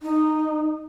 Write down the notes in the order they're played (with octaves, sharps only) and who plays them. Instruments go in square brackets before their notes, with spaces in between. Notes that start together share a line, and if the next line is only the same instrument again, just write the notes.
[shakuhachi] D#4